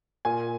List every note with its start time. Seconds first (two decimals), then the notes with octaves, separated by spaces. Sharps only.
0.25 A#2 G#5